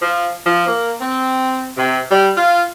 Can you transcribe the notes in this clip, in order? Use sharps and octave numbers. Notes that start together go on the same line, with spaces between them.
F3
F3
A#3
C4
C3
G3
F4